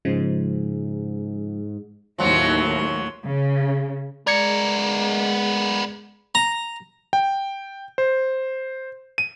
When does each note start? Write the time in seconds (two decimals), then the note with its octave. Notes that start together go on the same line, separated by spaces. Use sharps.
0.05 G#2 C#3 F3 G#3
2.19 D#2 A2 F3 F#3
3.26 C#3
4.27 G#3 B3 A#4 D5 G#6 C#7
6.35 A#5
7.13 G5
7.98 C5
9.18 D#7